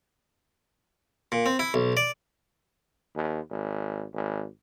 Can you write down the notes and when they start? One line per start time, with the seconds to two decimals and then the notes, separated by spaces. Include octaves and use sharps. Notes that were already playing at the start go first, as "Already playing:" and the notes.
1.32 A#2
1.46 C4
1.59 E4
1.74 B1
1.97 D5
3.15 D#2
3.50 G#1
4.13 G#1